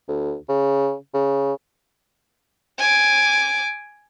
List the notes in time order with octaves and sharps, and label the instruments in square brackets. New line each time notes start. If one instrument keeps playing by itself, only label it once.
[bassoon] D2
C#3
C#3
[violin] G#5 D6